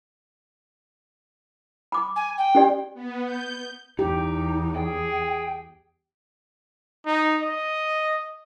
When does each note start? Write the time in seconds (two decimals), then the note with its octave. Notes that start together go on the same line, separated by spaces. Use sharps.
1.92 B5 D6
2.16 G#5
2.37 G5
2.55 C#4 G4 D5
2.94 B3
3.25 G6
3.99 E2 D#4 G4
4.76 G#4 G5
7.06 D#4
7.43 D#5